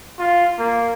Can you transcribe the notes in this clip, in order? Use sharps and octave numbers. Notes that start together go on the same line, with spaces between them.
F4
A#3